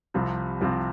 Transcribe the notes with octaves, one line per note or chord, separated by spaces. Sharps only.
C2 C3 F3 C4
C2 C3 F3 C4